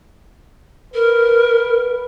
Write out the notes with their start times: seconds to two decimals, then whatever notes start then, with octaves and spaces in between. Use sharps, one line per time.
0.94 A#4 B4